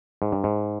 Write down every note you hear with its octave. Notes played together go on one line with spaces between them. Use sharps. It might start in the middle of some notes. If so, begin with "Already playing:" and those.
G#2
G2
G#2